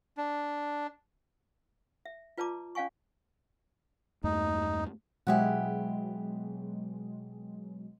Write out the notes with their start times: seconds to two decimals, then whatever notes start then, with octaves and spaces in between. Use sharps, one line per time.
0.17 D4
2.05 E5
2.38 F4 B4 D5 A5 A#5 D6
2.75 C#4 D5 F5 G#5 C#6
4.24 E2 G2 A3 D#4
5.27 B2 F#3 G#3 E4 G4 F#5